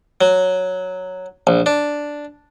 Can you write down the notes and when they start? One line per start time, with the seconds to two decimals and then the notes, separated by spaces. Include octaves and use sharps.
0.21 F#3
1.47 A#1
1.66 D4